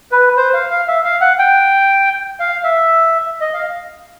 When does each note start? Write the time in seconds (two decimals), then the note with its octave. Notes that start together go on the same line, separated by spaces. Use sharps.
0.11 B4
0.37 C5
0.54 F5
0.70 F5
0.88 E5
1.04 F5
1.21 F#5
1.39 G5
2.40 F5
2.64 E5
3.41 D#5
3.54 F5